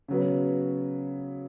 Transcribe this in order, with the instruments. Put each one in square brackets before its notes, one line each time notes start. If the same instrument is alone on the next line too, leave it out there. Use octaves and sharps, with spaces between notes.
[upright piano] C#3 F#3 B3